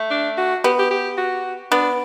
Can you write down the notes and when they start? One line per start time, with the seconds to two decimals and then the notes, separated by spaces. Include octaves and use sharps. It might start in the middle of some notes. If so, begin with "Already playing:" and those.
Already playing: A3
0.11 D4
0.38 F#4
0.64 B3 G4
0.79 G4
0.91 G4
1.18 F#4
1.72 B3 D4